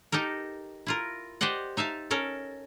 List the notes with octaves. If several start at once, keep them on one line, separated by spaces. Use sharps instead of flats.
D#4 G4 A4 A#4
E4 F4 A#4
G4 C5 D5 D#5 F#5
D#4 E5 F5 A5
C#4 A4 A#4